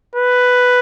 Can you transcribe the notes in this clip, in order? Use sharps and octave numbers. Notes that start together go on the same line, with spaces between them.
B4